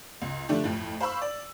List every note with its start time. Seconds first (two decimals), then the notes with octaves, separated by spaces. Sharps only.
0.22 C#2
0.49 D3 F3 A3 D4 G4
0.64 F2 A2
1.00 C5 F5 B5 C#6 E6
1.22 D5